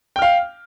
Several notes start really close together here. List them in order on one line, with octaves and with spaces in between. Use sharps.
G5 F6 F5